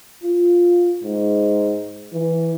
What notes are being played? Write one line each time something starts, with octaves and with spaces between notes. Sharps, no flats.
F4
G#2
E3